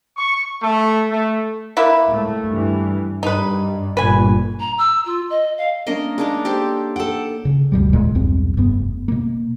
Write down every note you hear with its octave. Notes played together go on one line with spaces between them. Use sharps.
C#6
A3
A3
A#3 E4 B4
A2 A3
G2 E3
G2 D#4 B4
G1 A#2 B4 G#5
A#5
E6
F4
D#5
F5
A#3 C#4 D4 A#4 D#5
G#3 A#3 D4 D#4
G4 A4 C5
A4 F#5 G5
C#3
G1 D2 B2 G3
E1 A#2 G#3
B1 E2 G2 C4
F1 G2 B3
B2 A#3